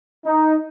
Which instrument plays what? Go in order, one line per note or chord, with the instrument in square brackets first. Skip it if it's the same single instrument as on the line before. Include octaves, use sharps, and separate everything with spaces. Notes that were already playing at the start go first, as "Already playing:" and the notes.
[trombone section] D#4